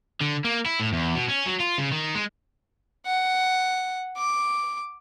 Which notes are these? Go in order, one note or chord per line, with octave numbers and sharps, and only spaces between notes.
D3
A#3
E4
A2
E2
B2
C#4
F#3
F4
C#3
D#3
G#3
F#5
D6